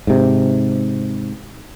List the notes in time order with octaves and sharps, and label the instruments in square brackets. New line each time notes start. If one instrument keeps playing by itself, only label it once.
[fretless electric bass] G#2 C3